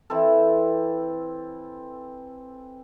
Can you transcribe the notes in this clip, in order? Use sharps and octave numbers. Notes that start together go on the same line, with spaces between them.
E3 C4 A4